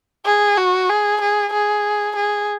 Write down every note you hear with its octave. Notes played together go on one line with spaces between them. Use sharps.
G#4
F#4
G#4
G#4
G#4
G#4